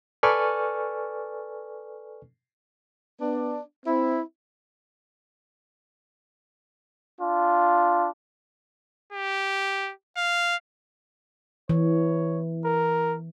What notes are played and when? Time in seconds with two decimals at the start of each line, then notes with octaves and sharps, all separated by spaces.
0.23 A4 B4 D5 G#5 C#6 F6
3.21 B3 D4
3.86 C4 E4
7.21 D4 F4
9.13 G4
10.17 F5
11.69 E3 C#5
12.64 A#4